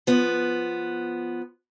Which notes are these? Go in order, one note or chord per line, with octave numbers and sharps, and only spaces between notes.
F3 B3